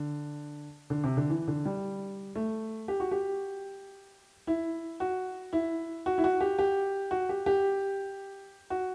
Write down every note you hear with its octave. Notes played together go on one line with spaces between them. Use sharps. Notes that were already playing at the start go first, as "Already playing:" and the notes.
Already playing: D3
D3
C3
D3
E3
D3
G3
A3
G4
F#4
G4
E4
F#4
E4
F#4
E4
F#4
G4
G4
F#4
G4
G4
F#4